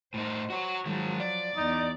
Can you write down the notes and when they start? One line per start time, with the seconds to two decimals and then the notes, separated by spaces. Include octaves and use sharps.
0.14 A2 D#4 C5
0.50 F#4 C#5
0.85 D#3 F3 F#3 G#3
1.20 D5
1.57 E2 D#4